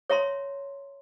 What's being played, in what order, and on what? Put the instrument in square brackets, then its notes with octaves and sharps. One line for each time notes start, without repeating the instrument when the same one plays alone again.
[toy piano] C#5 E5 A#5 C6